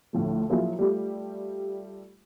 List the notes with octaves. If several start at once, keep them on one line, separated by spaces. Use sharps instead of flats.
D2 A2 F3 A3
F3 F#3 A#3 E4 F4 G#4
G3 A3 F4 G4